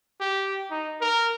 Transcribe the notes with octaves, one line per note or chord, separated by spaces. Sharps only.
G4
D#4
A#4